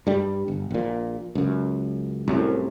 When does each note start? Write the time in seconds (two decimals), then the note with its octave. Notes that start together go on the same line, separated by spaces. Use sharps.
0.07 G2 G3
0.48 G1
0.71 A#1 A#2
1.35 C#2 F#2
2.28 C2 F#2 A2